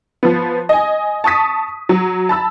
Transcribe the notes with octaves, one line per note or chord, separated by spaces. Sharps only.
F3 B3
D#5 G#5
A5 C#6 D#6 B6
F#3
A5 B5 E6